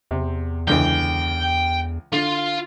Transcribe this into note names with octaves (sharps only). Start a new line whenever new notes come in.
E2 C3
C#2 D3 E3 G5
D3 F4